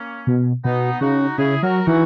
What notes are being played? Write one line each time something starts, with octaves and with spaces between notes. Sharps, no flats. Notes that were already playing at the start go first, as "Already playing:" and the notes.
Already playing: A#3 C#4
B2
B2 B3 D#4
C#3 D#4 F#4
C#3 E4 G#4
F#3 F#4 A#4
E3 D#4 F#4